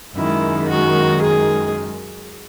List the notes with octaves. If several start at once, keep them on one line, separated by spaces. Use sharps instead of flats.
F#2 D#3 G#3 E4
F#4
G#4